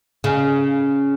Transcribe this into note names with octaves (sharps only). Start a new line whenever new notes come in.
C#3